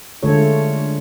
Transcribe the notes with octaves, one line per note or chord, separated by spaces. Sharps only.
D3 G#3 A3 F4 A4 C#5